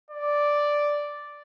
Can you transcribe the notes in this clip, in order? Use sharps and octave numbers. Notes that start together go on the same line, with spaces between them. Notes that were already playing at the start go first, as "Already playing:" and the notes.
D5